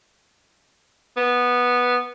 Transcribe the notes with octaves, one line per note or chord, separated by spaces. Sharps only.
B3